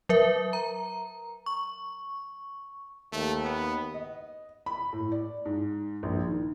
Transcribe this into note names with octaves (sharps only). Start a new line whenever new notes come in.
F#3 A#4 E5
A#5
C#6
D#2 A3
B3
D#5
B5
A2
D5
G#2
A#1
D#3